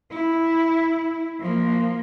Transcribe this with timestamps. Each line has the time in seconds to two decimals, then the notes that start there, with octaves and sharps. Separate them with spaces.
0.11 E4
1.40 F3 A#3